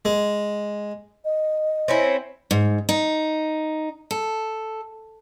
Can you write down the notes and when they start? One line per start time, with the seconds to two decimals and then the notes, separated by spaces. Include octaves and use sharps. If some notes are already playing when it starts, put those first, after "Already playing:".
0.05 G#3
1.25 D#5
1.88 C4 C#4 E4
2.51 G#2
2.89 D#4
4.11 A4